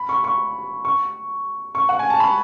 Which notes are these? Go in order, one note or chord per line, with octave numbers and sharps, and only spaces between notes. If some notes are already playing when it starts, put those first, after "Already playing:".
Already playing: B5
C#6
C#6
C#6
C#6
F#5
G#5
A5
B5